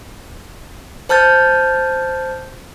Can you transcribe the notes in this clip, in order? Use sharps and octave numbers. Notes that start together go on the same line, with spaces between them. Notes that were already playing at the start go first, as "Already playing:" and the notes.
C5 A5 F6 G6 A6